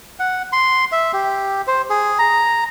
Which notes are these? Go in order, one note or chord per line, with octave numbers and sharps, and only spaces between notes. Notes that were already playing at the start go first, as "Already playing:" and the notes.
F#5
C6
E5
G4
C5
G#4
A#5